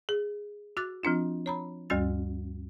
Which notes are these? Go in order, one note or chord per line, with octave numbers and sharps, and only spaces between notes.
G#4
F#4 D6 F#6 A6
F3 C4 D4 F4
C#5 A#5 B5
D2 G2 G3 C#4 F#4 A6